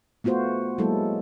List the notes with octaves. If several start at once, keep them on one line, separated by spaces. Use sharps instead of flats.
A3 B3 F4 F#4 C5
F#3 G#3 A#3 E4 A4